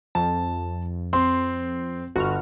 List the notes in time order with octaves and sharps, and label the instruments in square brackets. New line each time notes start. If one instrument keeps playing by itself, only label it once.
[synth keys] F2 [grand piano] A5
[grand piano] C4 C6
[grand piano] G1 [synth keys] F#4 F6